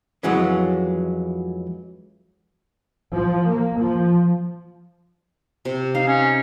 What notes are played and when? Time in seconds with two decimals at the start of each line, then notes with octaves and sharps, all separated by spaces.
0.23 F2 E3 F#3 G#3 C#4
3.13 F3
3.48 A#3
3.78 F3
5.65 C3
5.95 D#4 F5
6.07 C#4